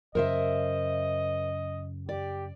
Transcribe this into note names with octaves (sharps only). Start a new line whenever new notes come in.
F#2 C#3 A#4 C5 D#5 E5
G4 D5